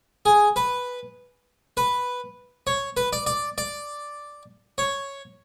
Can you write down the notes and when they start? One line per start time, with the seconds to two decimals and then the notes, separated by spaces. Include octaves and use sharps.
0.26 G#4
0.56 B4
1.77 B4
2.67 C#5
2.97 B4
3.13 D5
3.26 D5
3.58 D5
4.78 C#5